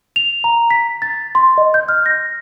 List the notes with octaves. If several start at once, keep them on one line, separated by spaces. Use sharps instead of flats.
F7
A#5
B6
A6
C6
D#5
G6
F6
A#6